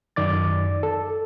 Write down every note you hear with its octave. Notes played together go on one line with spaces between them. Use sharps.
F#2 D#3 D5 D6 A6
A4